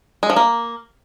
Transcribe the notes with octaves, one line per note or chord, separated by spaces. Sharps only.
G#3
F3
A#3